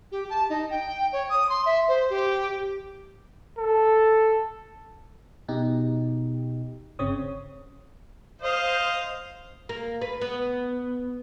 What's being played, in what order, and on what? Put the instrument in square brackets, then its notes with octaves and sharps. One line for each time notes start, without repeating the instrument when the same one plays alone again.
[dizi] G4
A5
D#4
G5
C#5
D#6
C6
E5
C5
G4
[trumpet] A4
[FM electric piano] B2 D#4 G4
G1 C#3 C4 C#5 D#6
[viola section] C5 [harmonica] D#5 F5
[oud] A#3
B4
B3